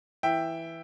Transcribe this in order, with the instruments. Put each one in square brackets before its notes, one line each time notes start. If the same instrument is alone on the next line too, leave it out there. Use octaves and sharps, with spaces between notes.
[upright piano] E3 E5 G5